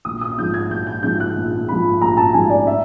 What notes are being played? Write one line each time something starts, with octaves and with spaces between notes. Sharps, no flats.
A#1 D#6
D#6
G#2 F3 G6
G#6
A#1 G6
G6
G#2 F3 G6
F#6
A#1
G#2 F3 B5
A#1 A#5
A5
G#2 F3 G#5
D5
E5